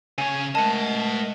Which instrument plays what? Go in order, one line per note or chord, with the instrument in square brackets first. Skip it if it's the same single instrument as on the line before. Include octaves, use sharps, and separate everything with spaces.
[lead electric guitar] C#3 C#5 [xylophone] G#5
[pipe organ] G#3 A3 A#4 [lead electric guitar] D#5 F#5 [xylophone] A5